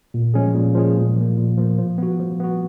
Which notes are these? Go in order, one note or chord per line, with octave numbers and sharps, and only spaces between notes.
A#2
F3 G#3 C#4 G#4
A#2
F3 G#3 C#4 G#4
A#2
F3 A#3
A#2
F3 A#3
F3
B3 F#4
F3
B3 F#4